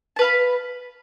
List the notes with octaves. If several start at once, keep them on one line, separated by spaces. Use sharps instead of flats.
B4 F5 A5 B5